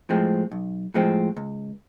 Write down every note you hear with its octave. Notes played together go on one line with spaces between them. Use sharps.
A2 F3 G#3 C4
B1
A2 F3 G#3 C4
C#2